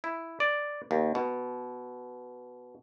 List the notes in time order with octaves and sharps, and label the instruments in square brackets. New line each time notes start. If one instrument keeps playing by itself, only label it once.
[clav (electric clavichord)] E4
D5
D#2
B2